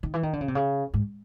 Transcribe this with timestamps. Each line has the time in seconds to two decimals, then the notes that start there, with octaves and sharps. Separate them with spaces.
0.03 D#3
0.14 E3
0.23 D#3
0.33 D3
0.41 C#3
0.48 C3
0.55 C#3
0.94 G#2